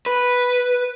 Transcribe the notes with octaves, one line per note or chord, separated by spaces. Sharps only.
B4